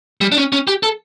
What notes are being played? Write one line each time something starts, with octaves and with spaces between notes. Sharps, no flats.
G3
D4
C#4
C#4
G4
A4